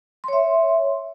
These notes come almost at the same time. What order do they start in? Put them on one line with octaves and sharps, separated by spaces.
C6 C#5 E5